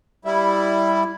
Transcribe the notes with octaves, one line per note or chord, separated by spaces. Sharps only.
G3 E4